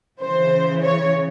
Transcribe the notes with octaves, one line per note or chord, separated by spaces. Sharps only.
C#3 E3 C5
C#5